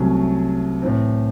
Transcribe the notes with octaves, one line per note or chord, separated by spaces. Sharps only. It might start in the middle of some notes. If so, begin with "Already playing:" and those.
Already playing: C2 C3 F#3 A3 C#4
A2 E3 C4